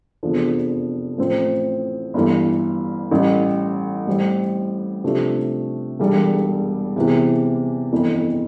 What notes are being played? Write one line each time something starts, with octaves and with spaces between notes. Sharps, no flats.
F1 E2 D3 F3
A1 A2 F3 C4
G1 G2 E3
A1 A2 G3
A2 G3 C4
C3 F3 A3 D4 G4
E1 E2 D3 G3
E2 C3 E3
G1 F2 E3